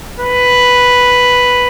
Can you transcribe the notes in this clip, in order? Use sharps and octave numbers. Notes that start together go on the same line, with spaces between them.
B4